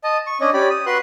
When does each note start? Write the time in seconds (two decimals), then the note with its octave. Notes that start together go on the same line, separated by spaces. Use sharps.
0.04 D#5 A5
0.27 C#6
0.41 C#4 D4 D#5
0.54 C#4 G4 D5 B5
0.70 D#6
0.86 F#4 B4 C6 F#6